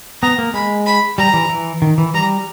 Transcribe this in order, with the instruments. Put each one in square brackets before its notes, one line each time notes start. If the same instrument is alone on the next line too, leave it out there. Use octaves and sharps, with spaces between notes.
[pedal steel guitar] B3 [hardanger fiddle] A#5
[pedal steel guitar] A#3
[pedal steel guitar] G#3 [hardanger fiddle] B5
[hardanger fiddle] B5
[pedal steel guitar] G3 [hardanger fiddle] A#5
[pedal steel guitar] E3
E3
D#3
E3
[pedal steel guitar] G3 [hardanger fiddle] A#5